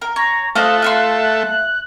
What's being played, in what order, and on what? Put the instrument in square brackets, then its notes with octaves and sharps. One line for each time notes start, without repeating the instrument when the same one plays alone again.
[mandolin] A#4
[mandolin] C#5 [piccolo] A#5
[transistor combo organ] A3 [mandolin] F4 C5 D#5 [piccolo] F#6
[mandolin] F4 E5 C6
[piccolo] F#6